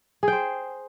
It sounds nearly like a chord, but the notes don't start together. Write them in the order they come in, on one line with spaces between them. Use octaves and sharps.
G#4 G5 C5